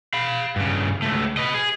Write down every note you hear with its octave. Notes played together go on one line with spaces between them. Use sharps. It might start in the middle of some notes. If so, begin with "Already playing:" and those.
F5 B5
G2 C#3
C#2 A3
B4 D#5
G#4